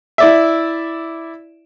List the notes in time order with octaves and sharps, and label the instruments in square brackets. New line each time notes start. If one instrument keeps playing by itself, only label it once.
[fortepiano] E4 D5 E5